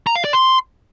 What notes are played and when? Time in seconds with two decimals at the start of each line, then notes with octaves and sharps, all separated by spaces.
0.07 A#5
0.16 F5
0.24 D5
0.33 C6